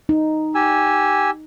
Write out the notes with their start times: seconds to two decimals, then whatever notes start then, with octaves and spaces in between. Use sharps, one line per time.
0.09 D#4
0.55 G4 G#5 E6